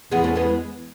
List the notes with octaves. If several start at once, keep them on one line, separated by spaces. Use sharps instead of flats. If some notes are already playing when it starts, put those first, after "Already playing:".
E2 G#3 B3
A3 C#4
G#3 B3